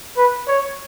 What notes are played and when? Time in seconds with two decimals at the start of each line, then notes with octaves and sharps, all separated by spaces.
0.17 B4
0.48 C#5